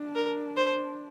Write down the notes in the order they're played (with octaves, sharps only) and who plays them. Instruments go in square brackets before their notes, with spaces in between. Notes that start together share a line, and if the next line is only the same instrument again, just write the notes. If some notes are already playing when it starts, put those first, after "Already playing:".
Already playing: [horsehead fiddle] D4
[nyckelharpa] A#4
C5